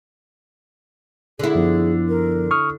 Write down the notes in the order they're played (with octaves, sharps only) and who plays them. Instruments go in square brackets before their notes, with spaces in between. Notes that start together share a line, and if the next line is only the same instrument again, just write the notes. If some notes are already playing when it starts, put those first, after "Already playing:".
[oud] D3 E4 [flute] G#4
[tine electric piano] F#2 F3 B3
[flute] A#4
[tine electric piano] C#6 D#6 F6